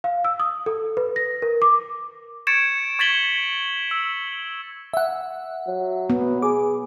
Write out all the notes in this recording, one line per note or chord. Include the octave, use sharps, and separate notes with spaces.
F5
E6
D#6
A4
B4
A#6
A#4
D6
C#6 G#6 A6 C#7 D7 E7
C#6 G#6 A6 B6 F#7 G7
E6
E5 F#5
F#3
B3
G#4 D6